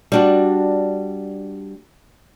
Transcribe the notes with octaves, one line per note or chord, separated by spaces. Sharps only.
G3 D4 F#4